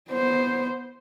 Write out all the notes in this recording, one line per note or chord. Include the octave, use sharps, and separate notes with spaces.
B3 C5